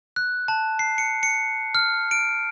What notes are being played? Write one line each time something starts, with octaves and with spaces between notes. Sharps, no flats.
F#6
A5
C7
C#7
C#7
F6
D7